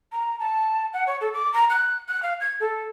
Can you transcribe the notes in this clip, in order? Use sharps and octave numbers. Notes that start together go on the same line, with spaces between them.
A#5
A5
F#5
C#5
A4
D6
A#5
F#6
F#6
F5
G#6
A4